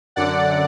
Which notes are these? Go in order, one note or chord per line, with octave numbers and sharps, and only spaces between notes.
F#2 D3 D5 F#5